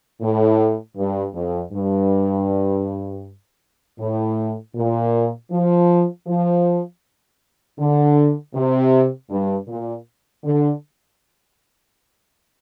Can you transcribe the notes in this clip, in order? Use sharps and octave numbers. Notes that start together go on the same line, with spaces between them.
A2
G2
F2
G2
A2
A#2
F3
F3
D3
C3
G2
A#2
D3